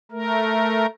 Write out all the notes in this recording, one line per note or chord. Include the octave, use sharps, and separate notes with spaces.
A3 A#4